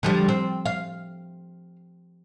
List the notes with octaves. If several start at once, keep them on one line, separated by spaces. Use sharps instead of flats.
D3 F3 G3
C4
F5